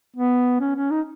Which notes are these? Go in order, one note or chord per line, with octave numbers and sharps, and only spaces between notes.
B3
C#4
C#4
D#4